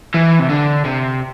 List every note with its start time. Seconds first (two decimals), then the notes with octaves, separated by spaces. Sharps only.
0.14 E3
0.39 C3
0.49 D3
0.85 C3